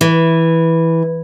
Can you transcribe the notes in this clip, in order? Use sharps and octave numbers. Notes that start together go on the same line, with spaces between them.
E3